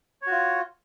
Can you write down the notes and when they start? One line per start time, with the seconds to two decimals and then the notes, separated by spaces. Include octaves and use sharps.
0.22 C#5
0.27 F#4
0.31 F4